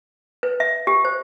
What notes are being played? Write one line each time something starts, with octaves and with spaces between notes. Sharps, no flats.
B4
E5
G4
C5